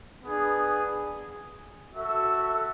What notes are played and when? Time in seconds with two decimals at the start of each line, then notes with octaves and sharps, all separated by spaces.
0.22 B3 D4 G#4
1.94 F#4 A4 E5